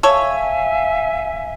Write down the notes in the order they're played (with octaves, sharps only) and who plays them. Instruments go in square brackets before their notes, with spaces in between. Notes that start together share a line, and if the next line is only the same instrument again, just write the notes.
[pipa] A4 C#5 [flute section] E5 F5 G#5